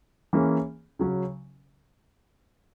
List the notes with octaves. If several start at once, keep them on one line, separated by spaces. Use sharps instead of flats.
E3 A#3 C#4 G#4
C#3 F#3 C#4